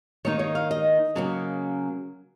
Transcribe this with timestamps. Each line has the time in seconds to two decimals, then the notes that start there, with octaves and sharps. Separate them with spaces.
0.25 D#3 A#3 D#4 C#5
0.39 C#5
0.55 F5
0.71 D#5
1.15 C#3 F#3 A#3 C#4